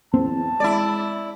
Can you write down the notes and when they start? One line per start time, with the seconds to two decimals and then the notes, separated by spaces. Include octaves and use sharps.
0.14 E2 C4 A5
0.60 G#3 E4 D5